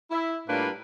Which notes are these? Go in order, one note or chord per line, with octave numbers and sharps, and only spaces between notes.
E4
A2 G3 A#3 D4 F4 B4